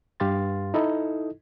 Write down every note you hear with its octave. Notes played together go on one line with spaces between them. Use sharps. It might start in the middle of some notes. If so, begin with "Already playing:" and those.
G2 G4 F5 C6 A6
D#4 E4 A4 D#5